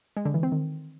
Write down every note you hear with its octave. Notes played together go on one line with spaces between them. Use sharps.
G#3
D3
E3
C4
D#3